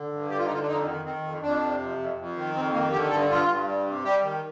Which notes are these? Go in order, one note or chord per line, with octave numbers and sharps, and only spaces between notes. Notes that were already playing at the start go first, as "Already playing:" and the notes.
Already playing: D3
G2
D3 G4
F4
D3 D#4
F4
D4
F2 D#4
D#3
D#3 C4
F2
F2 D4
C3
F2
F2
F2
D#3
F2 C4
D#3 A#3
D3 G4
G2 A4
G2 F4
G2
G3
C3
G3 G4
D#3